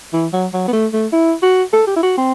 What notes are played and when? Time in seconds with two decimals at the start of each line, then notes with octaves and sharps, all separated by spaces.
0.13 E3
0.33 F#3
0.53 F#3
0.68 B3
0.73 A3
0.93 A3
1.13 E4
1.43 F#4
1.73 A4
1.87 G4
1.96 E4
2.03 F#4
2.18 C4